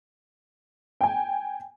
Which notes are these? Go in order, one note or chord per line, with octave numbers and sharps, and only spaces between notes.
G5 G#5